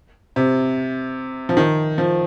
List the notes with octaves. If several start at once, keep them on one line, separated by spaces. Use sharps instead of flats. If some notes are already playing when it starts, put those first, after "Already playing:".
C3
F3
D#3
F3